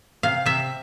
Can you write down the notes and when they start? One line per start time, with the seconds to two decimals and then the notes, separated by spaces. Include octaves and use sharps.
0.23 C3 F5
0.46 C3 E5